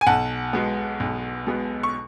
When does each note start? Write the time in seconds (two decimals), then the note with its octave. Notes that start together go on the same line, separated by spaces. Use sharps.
0.01 G#5
0.06 B1 F#5 A5
0.53 B2 G#3 B3
1.00 B1
1.46 B2 G#3 B3
1.83 C#6